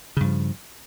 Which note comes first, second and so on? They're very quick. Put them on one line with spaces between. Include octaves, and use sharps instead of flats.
C#3 G2 F3